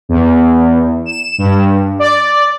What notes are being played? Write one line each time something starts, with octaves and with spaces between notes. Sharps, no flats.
E2
E7
G2
D5